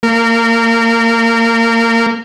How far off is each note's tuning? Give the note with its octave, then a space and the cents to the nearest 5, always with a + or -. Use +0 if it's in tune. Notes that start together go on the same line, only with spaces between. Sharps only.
A#3 -25